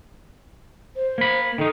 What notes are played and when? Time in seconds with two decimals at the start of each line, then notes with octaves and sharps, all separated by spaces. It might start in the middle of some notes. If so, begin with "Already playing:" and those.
0.96 C5
1.18 A#3 B5
1.58 D#3 D#4 A4